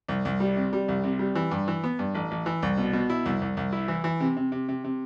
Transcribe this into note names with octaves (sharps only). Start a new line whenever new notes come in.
C2
C2
G3
C3
G3
C2
C3
G3
E3
G2
E3
B3
G2
A1
A1
E3
C2
B2
B2
E4
C2
C2
C2
E4
E3
E3
C3
C3
C3
C3
C3